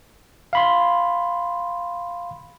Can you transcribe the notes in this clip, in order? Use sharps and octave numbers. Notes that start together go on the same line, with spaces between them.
F5 B5 C6